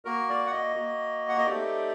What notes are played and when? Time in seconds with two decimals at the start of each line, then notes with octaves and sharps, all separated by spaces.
0.05 A#3 F#4 A#4
0.29 D5
0.47 F#5
0.52 D#5
0.76 A#3 F#4
1.29 F#5
1.38 D#5
1.46 A3 C4 D#4 G4 D5